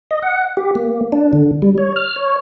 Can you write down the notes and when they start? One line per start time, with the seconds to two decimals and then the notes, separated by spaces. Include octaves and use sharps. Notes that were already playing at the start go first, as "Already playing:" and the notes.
0.11 D#5
0.22 F#5
0.57 G4
0.75 A#3
1.12 D4
1.33 D3
1.62 G3
1.78 C#5
1.96 F6
2.16 C#5